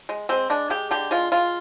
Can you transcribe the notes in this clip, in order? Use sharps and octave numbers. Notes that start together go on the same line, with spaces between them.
G#3
G#3 C4
G#3 D4
G#3 G4
D3 G4
G#3 F4
G#3 F4